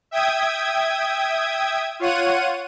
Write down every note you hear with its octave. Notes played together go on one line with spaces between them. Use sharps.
E5 G5 D#6 G#6
F4 C#5 F#5 D#7